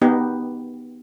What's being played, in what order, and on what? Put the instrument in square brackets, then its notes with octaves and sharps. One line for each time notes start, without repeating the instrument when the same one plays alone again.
[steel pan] B3 D#4 G4